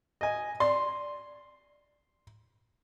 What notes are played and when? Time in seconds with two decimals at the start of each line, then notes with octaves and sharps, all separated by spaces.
0.21 D#5 G#5
0.60 D5 C6